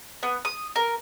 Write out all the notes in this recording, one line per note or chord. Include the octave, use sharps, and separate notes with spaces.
B3
D#6
A#4